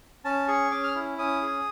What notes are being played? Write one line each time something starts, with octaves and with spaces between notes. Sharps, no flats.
C#4 A5
G#4 C#6
C#4 D6
F6
E4
C#4 D#6
G#4